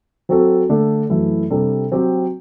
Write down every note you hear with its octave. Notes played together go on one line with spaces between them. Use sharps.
F#3 C4 F#4 A4
D3 A3 D4 A4
F#2 E3 A3 E4
C3 G3 D4 A4
F#3 C4 G4